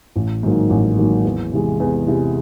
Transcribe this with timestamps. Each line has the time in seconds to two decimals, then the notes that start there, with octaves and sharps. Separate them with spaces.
0.16 A1
0.43 G#2 D#3 F#3 A#3
0.70 A1
0.98 G#2 D#3 F#3 A#3
1.25 E2
1.52 C3 E3 G#3
1.80 E2
2.07 C3 E3 G#3